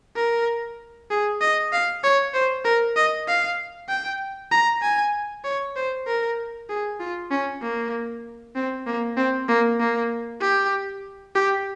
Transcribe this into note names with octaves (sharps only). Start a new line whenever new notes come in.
A#4
G#4
D#5
F5
C#5
C5
A#4
D#5
F5
G5
A#5
G#5
C#5
C5
A#4
G#4
F4
C#4
A#3
C4
A#3
C4
A#3
A#3
G4
G4